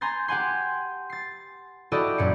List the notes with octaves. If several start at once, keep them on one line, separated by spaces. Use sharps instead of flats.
G#5 A#5 C6 G6 A6
G4 F#5 G#5 C6
A6 C7
E4 F#4 G4 A4 D5 D#5
A1 F#2 A#2 C#7